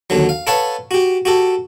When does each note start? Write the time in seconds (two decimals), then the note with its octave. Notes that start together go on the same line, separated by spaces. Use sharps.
0.10 D#2 D3 F#3
0.29 F5
0.47 A4 B4 C#5 F5 F#5 A5
0.91 F#4 G4
1.25 F#4 G4 A4